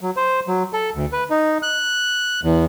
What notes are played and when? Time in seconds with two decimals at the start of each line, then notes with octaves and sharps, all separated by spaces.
0.01 F#3
0.17 C5
0.48 F#3
0.73 A4
0.95 D2
1.12 B4
1.30 D#4
1.63 F#6
2.43 E2